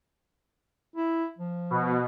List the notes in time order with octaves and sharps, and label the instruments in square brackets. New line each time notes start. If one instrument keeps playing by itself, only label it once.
[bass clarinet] E4
F3
[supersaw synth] B2